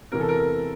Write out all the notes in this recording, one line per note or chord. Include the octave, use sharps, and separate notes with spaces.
E2 C3 E3 A#4
A4
A#4